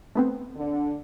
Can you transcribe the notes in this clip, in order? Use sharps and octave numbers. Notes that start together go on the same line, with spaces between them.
A3 B3 C4
D3